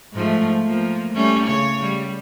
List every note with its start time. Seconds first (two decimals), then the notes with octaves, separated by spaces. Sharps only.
0.13 G#2 F3 A3
0.65 F3 A#3
1.14 G3 A3 C#4
1.46 C#3 C#5
1.81 G3